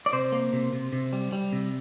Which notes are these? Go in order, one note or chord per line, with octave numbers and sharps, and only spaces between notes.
D5
C3 C5
A#3
C3
C3
C3
G3
G3
C3